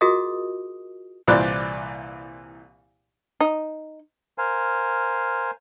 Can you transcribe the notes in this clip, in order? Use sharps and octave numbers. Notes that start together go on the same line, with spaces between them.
F4 F#4 G#4 A#4 D#5 D#6
C2 A#2 E3 C5 D5 F#6
D#4
A#4 C5 F5 G#5